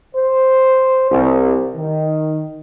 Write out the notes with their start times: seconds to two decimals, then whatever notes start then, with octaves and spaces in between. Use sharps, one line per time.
0.15 C5
1.11 C2
1.76 D#3